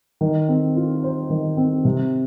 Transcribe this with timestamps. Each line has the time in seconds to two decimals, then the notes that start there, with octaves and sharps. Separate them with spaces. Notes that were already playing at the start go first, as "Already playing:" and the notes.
0.21 D#3
0.48 C4
0.76 F4
1.04 C5
1.30 D#3
1.57 C4
1.85 C3